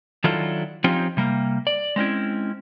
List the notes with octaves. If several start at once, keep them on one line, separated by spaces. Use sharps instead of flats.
D#3 F#3 D4 E4 F4 A4
F3 C4 C#4 D#4 F4 G4
C3 G3 A#3
D5
G#3 C4 C#4 E4